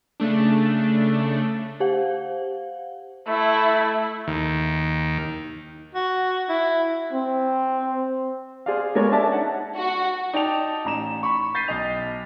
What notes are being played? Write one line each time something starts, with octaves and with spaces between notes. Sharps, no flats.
C#3 A3 D4
G4 C5 F5 F#5
A3 E4
D#2
F#4
E4
C4
G#4 C5 D5 F5
G#3 B3 A4 A#4 C#5 D5
C#4 D4 D5 E5 A5
D#4 F#5
F#4
D#4 D5 G5 A5 F7
A1 A#5 E7
B5 C#6
G6 A6 B6 C7 D#7
B1 D#5 F7